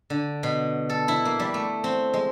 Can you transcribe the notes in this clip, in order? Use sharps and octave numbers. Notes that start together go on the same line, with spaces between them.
D3
B2
A4
E4
A#3
G3
A3
C4
G#3